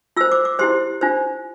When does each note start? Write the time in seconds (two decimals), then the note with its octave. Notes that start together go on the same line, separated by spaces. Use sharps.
0.16 F4 E6
0.21 C5
0.32 D6
0.45 D6
0.59 E4 G4 C5 C6
1.01 D4 F4 C5